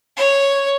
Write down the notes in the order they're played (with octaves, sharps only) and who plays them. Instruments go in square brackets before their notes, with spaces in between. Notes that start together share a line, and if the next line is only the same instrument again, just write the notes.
[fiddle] C#5